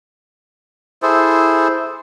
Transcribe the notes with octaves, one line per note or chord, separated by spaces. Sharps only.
E4 G#4 A4 C5